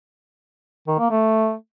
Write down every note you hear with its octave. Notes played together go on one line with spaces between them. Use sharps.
D#3
A#3
A3